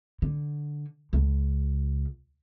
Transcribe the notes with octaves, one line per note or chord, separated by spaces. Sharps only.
D3
C#2